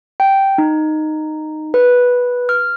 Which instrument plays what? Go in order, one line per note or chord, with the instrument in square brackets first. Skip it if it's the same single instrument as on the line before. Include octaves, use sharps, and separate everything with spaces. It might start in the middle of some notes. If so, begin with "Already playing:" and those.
[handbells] G5
D#4
B4
F6